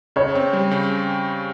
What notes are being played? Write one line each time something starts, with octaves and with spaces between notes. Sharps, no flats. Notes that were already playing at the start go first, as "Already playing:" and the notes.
C#3 C#5
C4
G3
C#3